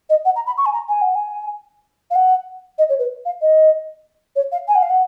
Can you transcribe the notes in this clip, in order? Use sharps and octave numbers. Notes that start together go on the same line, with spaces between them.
D#5
F#5
A#5
B5
C#6
G#5
A#5
G#5
F#5
G#5
F5
F#5
D#5
C#5
B4
F5
D#5
C#5
F5
G#5
F#5
F5
F#5